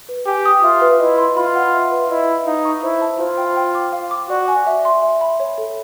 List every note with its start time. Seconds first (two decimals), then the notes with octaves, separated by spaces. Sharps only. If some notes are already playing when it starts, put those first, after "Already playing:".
0.09 B4
0.26 G4 G#5
0.45 D#6
0.63 F4 E5
0.82 B4
1.00 E4 D#5
1.18 C6
1.37 F4 B5
1.55 F#5
1.74 E5
1.91 B4
2.10 E4 D#5
2.28 B5
2.46 D#4 F5
2.65 C#6
2.83 E4 C5
3.01 A5
3.20 F4 C5
3.38 G5
3.57 G5
3.75 D6
3.92 F5
4.11 D6
4.29 F#4 D5
4.48 G#5
4.67 E5
4.85 C6
5.02 E5
5.21 B5
5.40 C#5
5.58 A4